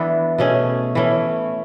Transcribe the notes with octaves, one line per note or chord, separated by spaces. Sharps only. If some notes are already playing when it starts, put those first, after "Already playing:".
Already playing: E3 B3 D4 A4
B2 A3 C#4 G#4
E3 A3 C#4